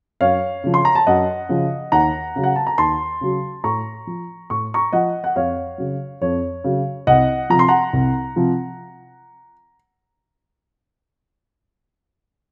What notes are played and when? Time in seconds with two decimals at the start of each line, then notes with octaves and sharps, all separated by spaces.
0.21 F#2 C#5 F5
0.64 C#3 F3
0.74 C6
0.85 A#5
0.95 A5
1.07 F#2 D#5 F#5
1.49 C#3 F3
1.92 D#2 F#5 A#5
2.36 C#3 F#3
2.44 F#5
2.56 A5
2.67 A#5
2.78 D#2 A5 C6
3.21 C#3 F#3
3.64 A2 A#5 C#6
4.07 F3
4.50 A2 C#6
4.74 A#5 C#6
4.92 F3 D#5 F#5
5.24 F#5
5.35 F2 C#5 F5
5.78 C#3 F#3
6.22 F2 C#5
6.64 C#3 F#3
7.07 C2 D#5 F#5
7.50 C3 F3 A#5
7.59 C6
7.68 F#5 A#5
7.93 C2
8.36 C3 F3